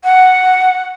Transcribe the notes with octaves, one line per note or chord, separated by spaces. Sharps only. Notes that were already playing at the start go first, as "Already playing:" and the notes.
F#5